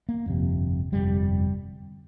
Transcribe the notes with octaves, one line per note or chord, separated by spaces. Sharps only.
A#3
G1 F2 C3
G1 F2 C3 G3